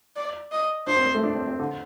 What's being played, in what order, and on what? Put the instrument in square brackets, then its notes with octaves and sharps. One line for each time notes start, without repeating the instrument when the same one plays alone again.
[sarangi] D5
D#5
[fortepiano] D4 [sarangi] C5
[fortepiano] C4
A#3
A3
D4
C4
C4
D3